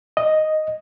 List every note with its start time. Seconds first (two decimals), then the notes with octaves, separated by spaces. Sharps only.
0.17 D#5